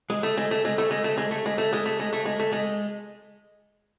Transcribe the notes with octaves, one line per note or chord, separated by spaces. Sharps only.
G#3
A3
G#3
A3
G#3
A3
G#3
A3
G#3
A3
G#3
A3
G#3
A3
G#3
A3
G#3
A3
G#3